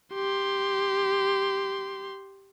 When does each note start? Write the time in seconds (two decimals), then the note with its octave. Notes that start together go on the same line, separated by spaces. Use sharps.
0.14 G4 C6